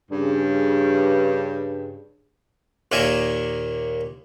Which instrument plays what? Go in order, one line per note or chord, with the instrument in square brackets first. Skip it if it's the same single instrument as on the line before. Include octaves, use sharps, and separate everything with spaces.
[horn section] G2 C#3
[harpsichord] D#2 A#2 A#3 A#4 E5 G#5